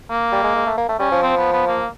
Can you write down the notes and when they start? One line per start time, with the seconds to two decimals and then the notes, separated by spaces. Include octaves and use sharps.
0.10 A#3
0.32 G3
0.43 G#3
0.55 G#3
0.67 A3
0.77 A#3
0.89 A3
0.99 G3 C#4
1.12 F3
1.22 C4
1.37 B3
1.53 B3
1.67 A#3